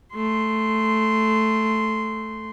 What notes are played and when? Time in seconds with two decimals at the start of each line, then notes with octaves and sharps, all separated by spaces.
0.15 A3 C6